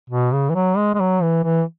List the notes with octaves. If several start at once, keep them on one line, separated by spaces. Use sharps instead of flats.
B2
C#3
E3
F#3
G#3
G#3
F#3
E3
E3